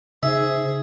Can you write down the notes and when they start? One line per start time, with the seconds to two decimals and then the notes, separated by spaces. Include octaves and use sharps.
0.23 C#3 D#4 G#4 C5 E5